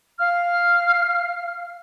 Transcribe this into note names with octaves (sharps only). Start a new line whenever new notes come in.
F5 F6